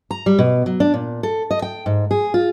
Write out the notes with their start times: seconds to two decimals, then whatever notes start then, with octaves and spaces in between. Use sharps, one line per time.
0.11 A#5
0.26 G3
0.39 B2
0.66 F#3
0.80 D4
0.94 A#2
1.23 A4
1.51 D#5
1.62 G5
1.86 G#2
2.11 G#4
2.34 F4